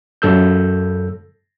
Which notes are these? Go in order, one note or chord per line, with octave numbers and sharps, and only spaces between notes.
F#2 A4 E6 G6